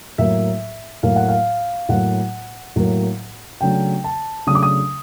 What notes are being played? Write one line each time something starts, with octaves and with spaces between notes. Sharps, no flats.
A2 F#3 A#3 E5
A2 F#3 A#3 F5
F#5
F5
A2 F#3 A#3 F#5
A2 F#3 A#3
C#3 F#3 A3 D4 G5
A5
C#3 F#3 A3 D4 D#6
D6
D#6